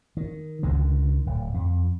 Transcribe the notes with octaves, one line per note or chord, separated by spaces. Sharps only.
D#3
C#2 D3 D#3
D1
F2